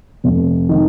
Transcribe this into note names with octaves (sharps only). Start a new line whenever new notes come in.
F1
D#3